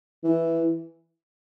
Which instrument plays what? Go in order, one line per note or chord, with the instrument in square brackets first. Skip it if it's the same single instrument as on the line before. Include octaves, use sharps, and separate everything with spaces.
[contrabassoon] E3